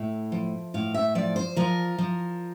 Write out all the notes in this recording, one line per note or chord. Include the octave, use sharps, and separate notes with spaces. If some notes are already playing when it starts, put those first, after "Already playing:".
Already playing: A2 E5
F3
A2 F5
E5
F3 D5
C5
F3 A#4
F3